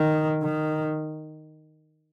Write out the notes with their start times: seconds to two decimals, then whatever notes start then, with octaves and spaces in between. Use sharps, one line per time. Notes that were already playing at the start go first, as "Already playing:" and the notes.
Already playing: D#3
0.43 D#3